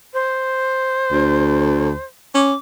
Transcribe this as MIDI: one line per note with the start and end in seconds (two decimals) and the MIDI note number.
0.14 2.04 72
1.11 1.93 38
2.35 2.53 61
2.35 2.55 86